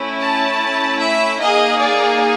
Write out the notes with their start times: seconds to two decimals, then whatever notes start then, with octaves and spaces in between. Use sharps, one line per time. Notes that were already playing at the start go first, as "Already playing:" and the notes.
Already playing: A3 C#4 E4
0.22 A5
1.00 E5
1.39 A#3 D#4 G#4 D#5
1.79 D5